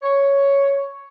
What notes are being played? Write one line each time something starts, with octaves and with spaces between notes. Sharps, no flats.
C#5